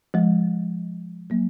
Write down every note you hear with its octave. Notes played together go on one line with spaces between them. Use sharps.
F3 G#3
F#3 A#3